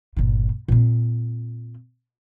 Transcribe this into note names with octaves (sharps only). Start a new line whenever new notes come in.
G1 A#2
A#2 C4